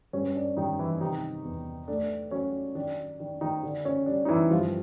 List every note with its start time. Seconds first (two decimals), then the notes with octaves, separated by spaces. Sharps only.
0.13 G2 C#4
0.35 D4
0.57 G2 D#3 D#4
0.79 E3 E4
1.01 C3 D#3 D#4
1.44 E2
1.88 A3 D4
2.31 F#3 C#4
2.75 D#3 D4
3.19 D#3 D4
3.41 D#3 D#4
3.63 D3 D4
3.85 C#4
4.06 G3 D4
4.25 D#4
4.28 E3 E4
4.50 G2 F3 F4